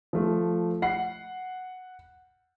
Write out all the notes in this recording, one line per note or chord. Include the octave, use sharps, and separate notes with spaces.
F3 A3
F#5 C7